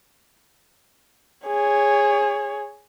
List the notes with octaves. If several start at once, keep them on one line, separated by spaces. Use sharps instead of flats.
G#4 C#5